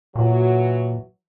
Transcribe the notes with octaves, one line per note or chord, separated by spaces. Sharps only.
A#2 E3 F#3